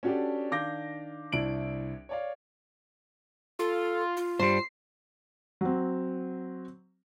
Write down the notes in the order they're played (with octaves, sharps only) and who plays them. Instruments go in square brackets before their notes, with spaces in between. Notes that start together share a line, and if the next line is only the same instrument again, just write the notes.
[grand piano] C#4 D4 F#4 G4 A4 D5
D#3 D4 F5 D6 G6 A#6
C2 D4 E4 D7 F#7
C#5 D5 F5
[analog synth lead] F4 [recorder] A4
[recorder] F4
[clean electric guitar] G2 G3 [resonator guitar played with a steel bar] C5 [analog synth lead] C7
[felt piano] F#3 C4